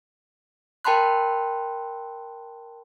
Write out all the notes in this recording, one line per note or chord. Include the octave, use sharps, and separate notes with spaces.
A#4 G5 A5 B5 C6 F#6